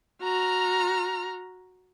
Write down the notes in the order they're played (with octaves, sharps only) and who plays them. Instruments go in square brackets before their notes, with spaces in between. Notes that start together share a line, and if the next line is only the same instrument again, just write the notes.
[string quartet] F#4 A#5 F6